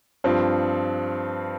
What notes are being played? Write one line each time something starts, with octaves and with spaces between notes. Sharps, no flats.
G2 F3 C4